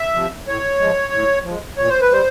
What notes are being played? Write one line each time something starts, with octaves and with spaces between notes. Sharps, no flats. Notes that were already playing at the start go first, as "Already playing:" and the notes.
Already playing: E5
C3 F3
A2 C#5
F3 G#3
A2
F3 G#3
A#2 C#5
C5
B4
G3 C5